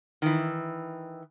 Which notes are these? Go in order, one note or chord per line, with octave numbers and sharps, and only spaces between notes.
D#3 E3